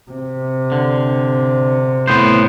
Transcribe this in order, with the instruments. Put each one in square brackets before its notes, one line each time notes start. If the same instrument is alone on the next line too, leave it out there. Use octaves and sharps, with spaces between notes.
[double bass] C3
[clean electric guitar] D3
A2 B3 C5